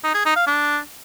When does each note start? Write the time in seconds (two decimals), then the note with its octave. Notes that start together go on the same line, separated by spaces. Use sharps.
0.04 D#4
0.15 G#4
0.25 D#4
0.36 F5
0.47 D4